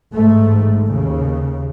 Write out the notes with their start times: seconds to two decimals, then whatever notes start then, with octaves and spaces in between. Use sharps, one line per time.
0.13 A1 G#2 A3
0.89 D#2 C#3